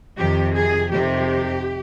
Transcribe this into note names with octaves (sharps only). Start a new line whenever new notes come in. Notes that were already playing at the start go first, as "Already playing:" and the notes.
F2 C3 D#3 G4
G#4
F2 C3 D#3 G4